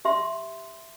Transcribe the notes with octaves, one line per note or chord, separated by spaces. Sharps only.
G4 E5 C6